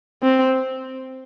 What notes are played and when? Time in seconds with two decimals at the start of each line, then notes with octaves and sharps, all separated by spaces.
0.23 C4